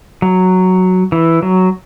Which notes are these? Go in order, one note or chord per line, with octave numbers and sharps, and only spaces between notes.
F#3
E3
F#3